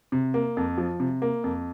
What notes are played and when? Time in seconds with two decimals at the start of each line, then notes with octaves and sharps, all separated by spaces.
0.12 C3
0.34 A#3
0.57 F2
0.78 F3
1.00 C3
1.22 A#3
1.44 F2